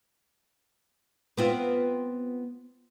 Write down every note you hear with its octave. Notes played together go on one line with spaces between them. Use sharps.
B3 C4 F4